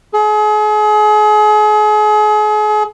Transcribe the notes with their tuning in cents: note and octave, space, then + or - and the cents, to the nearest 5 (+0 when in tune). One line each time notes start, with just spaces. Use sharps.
G#4 +35